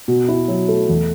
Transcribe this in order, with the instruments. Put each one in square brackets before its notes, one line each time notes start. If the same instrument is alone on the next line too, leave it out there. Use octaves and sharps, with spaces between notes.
[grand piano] B2
E4
F#3
A3
E2